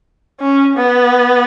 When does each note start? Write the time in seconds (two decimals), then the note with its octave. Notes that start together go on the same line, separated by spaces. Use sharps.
0.40 C#4
0.77 B3